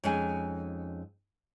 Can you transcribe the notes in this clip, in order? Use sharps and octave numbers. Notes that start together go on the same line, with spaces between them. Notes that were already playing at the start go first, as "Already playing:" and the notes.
F2 G#3 C#4 D#4 G#5